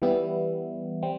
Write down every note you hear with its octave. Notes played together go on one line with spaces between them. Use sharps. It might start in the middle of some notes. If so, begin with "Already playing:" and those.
E3 G3 B3 E4
G3 C4